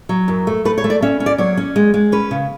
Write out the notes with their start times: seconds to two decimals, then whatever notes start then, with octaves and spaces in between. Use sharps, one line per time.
0.09 F#3
0.28 F#2
0.47 A3
0.65 A3 B4
0.78 C#5
0.84 A3
0.90 D5
1.02 C#4 E5
1.20 C#4
1.26 D5
1.38 F#3 C#5
1.57 C#4
1.76 G#3
1.94 G#3
2.12 C#4 B4
2.31 C#3